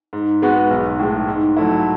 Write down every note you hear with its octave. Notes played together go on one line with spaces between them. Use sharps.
G#2
G#3 B3 F#4
B1
A2 G#3
G#2
F#3 A3 E4